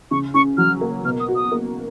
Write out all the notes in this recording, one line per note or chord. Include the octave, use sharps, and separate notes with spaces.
C#3 C#6
C#4 C#6
F#3 F6
A#3
B2 F6
D#6
F#4
D#6
A#3